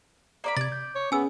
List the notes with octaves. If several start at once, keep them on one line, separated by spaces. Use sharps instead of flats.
A#3 D5 B5
C3 D5 G#6 A6
G6
C#5
B3 C#4 G#4 G#5 E6